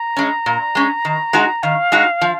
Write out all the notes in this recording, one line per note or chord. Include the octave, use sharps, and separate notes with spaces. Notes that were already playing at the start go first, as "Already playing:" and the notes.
Already playing: A#5
G#3 C#4
A#2
G#3 C#4
D#3
G#3 D#4 F#4
D#3 F5
G#3 D#4 F#4
F3